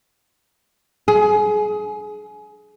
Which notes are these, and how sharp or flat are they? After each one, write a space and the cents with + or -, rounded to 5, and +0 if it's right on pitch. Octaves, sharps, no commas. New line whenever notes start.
G#4 +25